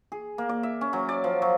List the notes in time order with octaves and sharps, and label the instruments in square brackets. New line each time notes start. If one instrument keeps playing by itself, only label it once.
[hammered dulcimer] G#4
A#3
D5
E5
C#4
F#3
D5
F3
F#3